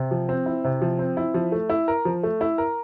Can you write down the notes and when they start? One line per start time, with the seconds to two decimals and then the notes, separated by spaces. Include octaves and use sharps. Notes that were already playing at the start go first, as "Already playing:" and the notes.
Already playing: C3
0.11 F3
0.29 C4
0.46 E4
0.64 C3
0.82 F3
0.99 C4
1.17 E4
1.34 F3
1.52 A3
1.70 E4
1.88 A#4
2.05 F3
2.23 A3
2.41 E4
2.58 A#4